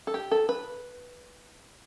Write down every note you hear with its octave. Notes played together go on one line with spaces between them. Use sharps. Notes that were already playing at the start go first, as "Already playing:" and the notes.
A4
G4
A4
B4